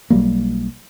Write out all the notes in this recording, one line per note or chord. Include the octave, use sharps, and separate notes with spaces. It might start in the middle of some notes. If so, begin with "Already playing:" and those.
B1 F#3 G3 A#3